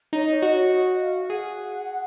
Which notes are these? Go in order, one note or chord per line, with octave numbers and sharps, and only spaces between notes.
D#4 C#5
D#5
C#5
F#4 D#5
C#5
D#5
F5
G#4 F#5